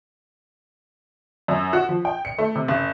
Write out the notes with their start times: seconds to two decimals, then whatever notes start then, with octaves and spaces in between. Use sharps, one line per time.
1.48 F#2
1.73 F#4
1.89 F3
2.05 G5
2.25 C#7
2.38 A3
2.55 C3
2.68 F#1